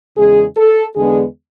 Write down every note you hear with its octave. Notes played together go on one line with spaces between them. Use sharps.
E2 C#3 G#3 G#4
A4
E2 D3 G#3 B3 D4 G#4